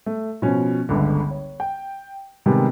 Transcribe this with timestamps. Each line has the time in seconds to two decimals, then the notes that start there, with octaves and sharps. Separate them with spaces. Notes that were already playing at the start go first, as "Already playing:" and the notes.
0.06 A3
0.42 B2 F3 C#4
0.89 G1 C#2 D3
1.31 C#5
1.60 G5
2.46 C3 D#3 G3 G#3 B3